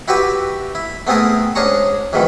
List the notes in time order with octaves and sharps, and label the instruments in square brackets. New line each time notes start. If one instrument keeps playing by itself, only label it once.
[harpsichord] E4 F#4 G4 B4 E5
E4
A3 B3 C4 E4 G#4 A#4
G#2 C#4 D4 G#4 A#5 C#6
F2 G#2 B2 D#3 E3